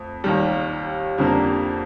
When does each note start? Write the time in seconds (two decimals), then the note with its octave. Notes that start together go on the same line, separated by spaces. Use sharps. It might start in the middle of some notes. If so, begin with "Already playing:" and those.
Already playing: F2 A3
0.24 D#2 D#3 G3
1.18 F2 D3 G3 A#3